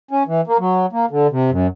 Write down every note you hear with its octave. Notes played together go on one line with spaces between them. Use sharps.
C#4
E3
A#3
F#3
A#3
D3
C3
F#2